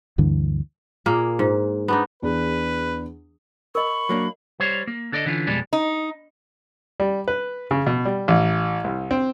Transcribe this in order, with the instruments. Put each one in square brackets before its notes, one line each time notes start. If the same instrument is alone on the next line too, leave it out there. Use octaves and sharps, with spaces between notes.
[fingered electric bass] D2 G2 D3 E3
[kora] A#2 A#3 G#4
G#2
B3 D4 D#4
[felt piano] E2 D4 G#4 [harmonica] B4
[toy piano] A#4 D#5 [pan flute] B5 [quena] C#6
[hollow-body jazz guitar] F#3 A#3 D4
[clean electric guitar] G3 C5 C#5
A#3
D3 A4 D5 D#5
D3 E3 C#4 F4
F2 B2 G3 G#3 D5
[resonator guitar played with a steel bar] D#4
[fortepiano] G3
B4
C#3
B2
G3
A1
C2
C4